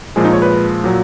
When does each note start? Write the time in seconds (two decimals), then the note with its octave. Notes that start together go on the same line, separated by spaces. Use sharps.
0.16 A#2 F3 G#3 G#4
0.24 D#4
0.33 C#5
0.42 B4
0.84 A#2 F#3